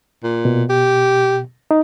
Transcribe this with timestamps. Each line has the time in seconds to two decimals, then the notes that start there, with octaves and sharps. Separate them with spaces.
0.23 A#2
0.45 B2
0.69 G4
1.71 D#4